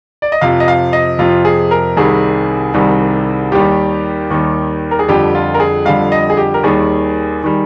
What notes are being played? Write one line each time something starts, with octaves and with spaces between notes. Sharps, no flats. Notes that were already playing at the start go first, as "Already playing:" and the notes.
D5
D#5
F2 C3 F3 F5
D#5
F5
D#5
F2 C3 F3 F4
G#4
A#4
C2 C3 D#3 G3 G#4
C2 C3 D#3 G3
D#2 D#3 G3 G4
D#2 D#3 G3
A#4
G#4
F2 D3 G3 G4
F4
A#4
G#4
F2 D3 G3 F5
D#5
G#4
G4
A#4
D#2 D#3 G3 G#4
D#3 G3